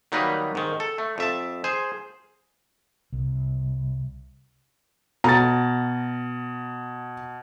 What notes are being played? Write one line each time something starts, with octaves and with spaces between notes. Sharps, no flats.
D#3 F#3 G3 A#3 D#4 B4
G#2 D#3
A4
A3
F2 E5 A5
G#4 C5
C2
B2 A#5 A6